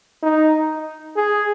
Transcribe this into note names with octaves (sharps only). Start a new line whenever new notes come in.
D#4
G#4